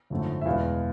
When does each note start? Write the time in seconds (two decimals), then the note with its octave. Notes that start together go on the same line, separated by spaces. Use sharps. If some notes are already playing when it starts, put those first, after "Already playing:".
0.10 G#1 F#2 D3 F3 A3
0.41 E5
0.45 E2 B2 G#3 B3 F5